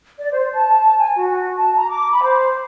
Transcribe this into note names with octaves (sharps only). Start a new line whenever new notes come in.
D5
C5
A5
G#5
F#4
A5
A#5
D6
B5
C5